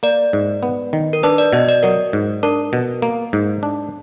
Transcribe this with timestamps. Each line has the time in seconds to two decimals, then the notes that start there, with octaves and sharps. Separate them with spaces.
0.03 A#3 D5
0.33 G#2
0.63 B3
0.93 D#3
1.13 A#4
1.23 D4 B4
1.38 D5
1.53 B2 D#5
1.69 D5
1.83 F#3 A#4
2.13 G#2
2.43 D4 A#4
2.73 B2
3.02 A#3
3.33 G#2
3.63 D4